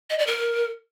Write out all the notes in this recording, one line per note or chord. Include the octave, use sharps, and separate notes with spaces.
D#5
D5
A#4